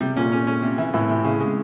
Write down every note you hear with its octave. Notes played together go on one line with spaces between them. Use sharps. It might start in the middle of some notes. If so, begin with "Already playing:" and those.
C3 G3
A#2 C#4
C#4
C#4
C3
E3
A2 E3
C3
C#3
G#3